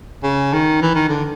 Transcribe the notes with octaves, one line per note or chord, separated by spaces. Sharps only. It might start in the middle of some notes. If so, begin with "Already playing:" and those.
C#3
D#3
E3
D#3
D3